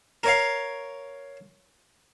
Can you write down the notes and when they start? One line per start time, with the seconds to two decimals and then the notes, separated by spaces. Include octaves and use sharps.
0.23 A#4 C#5 F5